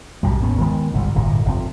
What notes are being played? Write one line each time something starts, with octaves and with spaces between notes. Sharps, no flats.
B1 F#2 A2 G3
G#1 D#2 B3 C#4
D#3 G#3 B3
G1 C2 G#2 C3
D1 G1 A#2
F1 C4